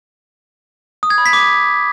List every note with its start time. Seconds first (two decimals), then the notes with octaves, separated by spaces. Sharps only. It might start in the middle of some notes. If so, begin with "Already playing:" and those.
1.03 D#6
1.10 G#6
1.18 B5
1.26 B6
1.33 D6